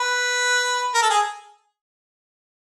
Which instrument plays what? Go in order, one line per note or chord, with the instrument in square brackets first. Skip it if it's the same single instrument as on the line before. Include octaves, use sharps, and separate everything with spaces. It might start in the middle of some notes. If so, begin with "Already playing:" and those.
Already playing: [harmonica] B4
A#4
A4
G#4